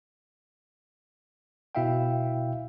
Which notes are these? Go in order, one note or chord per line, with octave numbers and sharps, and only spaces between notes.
B2 E4 E5 F5 G5